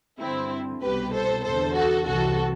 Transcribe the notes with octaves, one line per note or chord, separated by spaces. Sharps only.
G2 D3 C4 E4
C2 B2 G4 B4
A4 C5
E2 D3 A4 C5
F#4 A4
C2 C3 E3 F#4 A4